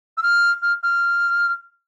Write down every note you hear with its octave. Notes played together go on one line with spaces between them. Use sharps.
E6
F6
F6
F6